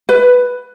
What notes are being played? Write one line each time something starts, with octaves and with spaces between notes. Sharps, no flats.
B4